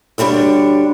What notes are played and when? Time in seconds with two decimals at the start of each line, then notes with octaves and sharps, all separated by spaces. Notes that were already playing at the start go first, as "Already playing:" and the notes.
0.18 D2 D3 G3 D4 C#5